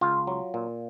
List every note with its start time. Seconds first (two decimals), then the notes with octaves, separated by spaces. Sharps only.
0.01 C#2 F4
0.27 F#3
0.54 A#2